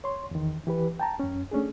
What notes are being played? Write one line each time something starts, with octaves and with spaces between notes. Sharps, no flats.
C#5 C6
E2 D#3
E3 G4 B4
G5 A5 A#5
F#2 C#4
A3 C#4 D4 G#4